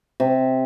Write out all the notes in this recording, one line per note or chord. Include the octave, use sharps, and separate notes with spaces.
C3